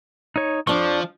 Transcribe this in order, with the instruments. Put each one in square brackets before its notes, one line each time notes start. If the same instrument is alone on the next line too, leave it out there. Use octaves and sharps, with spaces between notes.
[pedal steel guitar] D#4 C#5
[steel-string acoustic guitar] F2 D4 [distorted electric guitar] F3 [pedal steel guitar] C#6 D6